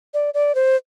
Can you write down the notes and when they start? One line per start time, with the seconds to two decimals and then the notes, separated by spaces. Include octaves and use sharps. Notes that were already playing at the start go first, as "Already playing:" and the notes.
0.14 D5
0.34 D5
0.55 C5